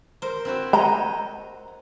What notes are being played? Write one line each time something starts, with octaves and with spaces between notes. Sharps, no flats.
A#4 C5
C4 E4 F#4
C5 C#5 D#5 A#5